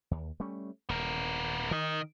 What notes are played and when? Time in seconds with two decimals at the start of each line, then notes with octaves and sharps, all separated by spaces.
0.11 D#2
0.40 G3 A3 C#4
0.89 D#1 B3 A#4
1.71 D#3 A#4 D#5